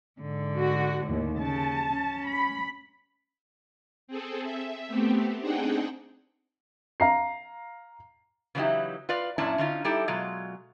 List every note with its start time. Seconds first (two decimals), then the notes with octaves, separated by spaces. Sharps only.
0.20 G#2 D3
0.57 F#4
1.04 D#2 A2
1.38 C#3 A5
1.93 C#4
2.28 B5
4.08 C4 G#4 A4
4.44 E5
4.88 A3 B3 C4 G4
5.40 C4 D4 D#4 G#4 F#5 G5
7.00 F5 A#5 C7
8.55 C#3 E3 F#3 D#4 E4 G4
9.09 F4 B4 D5 F5
9.38 F#2 A#2 C#4 D4 E4 A5
9.58 D3 C#4 D#4 F4
9.84 G3 D#4 E4 G4 A4
10.08 B2 F#3 G#3 F4